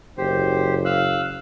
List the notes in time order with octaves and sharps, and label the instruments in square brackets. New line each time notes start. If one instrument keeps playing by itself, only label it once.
[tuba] F#1 [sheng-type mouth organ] G4 C5
[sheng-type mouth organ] F5 E6 F#6